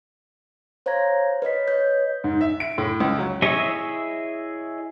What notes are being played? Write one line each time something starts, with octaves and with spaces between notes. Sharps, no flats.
C5 C#5 F5 A#5 G#6 A#6
B4 C#5 D#5 B6
C#5 D#5 G6
G#2
E5
D7
A2
C#2
F#3
E4 G#4 C#5 D#5 E5